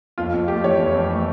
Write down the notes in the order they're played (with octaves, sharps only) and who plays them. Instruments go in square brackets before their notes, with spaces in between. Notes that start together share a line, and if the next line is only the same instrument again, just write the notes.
[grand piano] F2 [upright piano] F4
[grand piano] F2
[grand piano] A3 [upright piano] G4
[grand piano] E3 [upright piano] C#5
[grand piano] F2
F2
A3